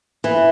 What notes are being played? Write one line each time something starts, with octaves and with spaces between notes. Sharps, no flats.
E3